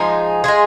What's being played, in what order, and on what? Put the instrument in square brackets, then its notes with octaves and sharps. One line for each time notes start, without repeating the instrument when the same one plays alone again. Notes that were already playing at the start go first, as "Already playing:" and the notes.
Already playing: [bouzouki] F3 G#3 D#4 G#4
G#3 F4 G#4